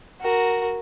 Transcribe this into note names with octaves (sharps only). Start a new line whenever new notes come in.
F#4 A#4